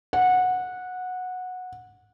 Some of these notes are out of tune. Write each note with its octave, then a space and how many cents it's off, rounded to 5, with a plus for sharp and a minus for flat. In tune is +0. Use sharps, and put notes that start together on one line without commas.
F#5 -15